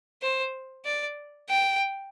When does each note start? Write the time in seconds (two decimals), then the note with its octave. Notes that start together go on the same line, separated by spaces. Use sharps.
0.22 C5
0.85 D5
1.49 G5